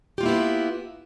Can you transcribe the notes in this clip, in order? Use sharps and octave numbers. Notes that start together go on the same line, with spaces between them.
A#3 B3 E4 F4 G4